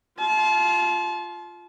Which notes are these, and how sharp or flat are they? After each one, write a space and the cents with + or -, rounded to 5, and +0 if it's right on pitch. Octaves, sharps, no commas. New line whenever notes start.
F4 +0 A5 -35